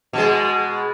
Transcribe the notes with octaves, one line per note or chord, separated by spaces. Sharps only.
B2 G#3